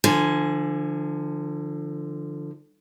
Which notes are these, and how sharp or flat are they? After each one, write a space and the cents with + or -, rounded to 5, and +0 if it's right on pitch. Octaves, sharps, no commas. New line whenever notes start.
D3 +15 F3 -20 G#5 +0